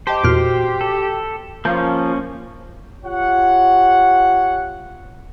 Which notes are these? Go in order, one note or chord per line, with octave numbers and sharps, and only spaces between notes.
G4 C5 D#5 G5 A5
E2 A#2 F#4 F6 C7 D7
A4 G5
F3 A#3 C#4 G6
F4 G4 C#5 F#5